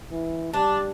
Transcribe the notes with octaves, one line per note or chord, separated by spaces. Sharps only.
E3
G3 D4